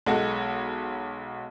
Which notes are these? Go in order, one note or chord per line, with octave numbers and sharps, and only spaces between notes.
B1 G#3 F#4 A4 A5